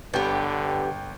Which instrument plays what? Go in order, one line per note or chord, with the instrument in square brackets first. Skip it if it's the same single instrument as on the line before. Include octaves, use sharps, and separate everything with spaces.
[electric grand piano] G1 G5 [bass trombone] D3 [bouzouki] B3 G4